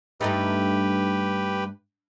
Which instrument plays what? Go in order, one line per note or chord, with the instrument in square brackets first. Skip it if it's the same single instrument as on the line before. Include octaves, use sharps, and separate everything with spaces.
[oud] G2 A3 D#4 [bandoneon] G4 B4